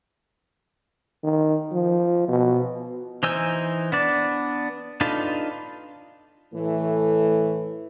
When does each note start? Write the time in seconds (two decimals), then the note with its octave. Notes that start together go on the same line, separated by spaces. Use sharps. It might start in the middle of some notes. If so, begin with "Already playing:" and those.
1.24 D#3
1.72 F3
2.28 B2
3.23 E3 D#4 C5 G#5 E6
3.92 B3 D4 D5
5.01 D4 D#4 F4 A4 B4
6.55 A2 E3 A3